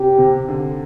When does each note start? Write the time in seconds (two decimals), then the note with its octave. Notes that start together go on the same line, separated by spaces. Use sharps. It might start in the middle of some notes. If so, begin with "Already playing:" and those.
Already playing: C3 G4
0.18 C3
0.48 D3